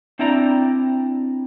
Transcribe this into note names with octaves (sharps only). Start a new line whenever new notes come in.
C4 D4 E4 D5 G5 A#5